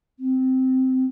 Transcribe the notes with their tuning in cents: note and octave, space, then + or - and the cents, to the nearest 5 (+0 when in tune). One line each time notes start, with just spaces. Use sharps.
C4 -10